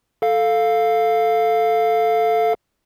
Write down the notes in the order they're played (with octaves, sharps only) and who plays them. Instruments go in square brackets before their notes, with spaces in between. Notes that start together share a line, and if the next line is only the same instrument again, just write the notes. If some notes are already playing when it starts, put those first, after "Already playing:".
[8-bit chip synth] A4 F5